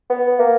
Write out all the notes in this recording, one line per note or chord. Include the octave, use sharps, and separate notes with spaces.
B3
A#3